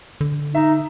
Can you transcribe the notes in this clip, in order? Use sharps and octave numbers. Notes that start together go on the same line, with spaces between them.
D3
D#4 E5